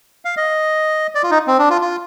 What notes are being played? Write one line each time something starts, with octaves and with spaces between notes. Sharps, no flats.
F5
D#5
D5
F4
D#4
C4
D4
F4
F4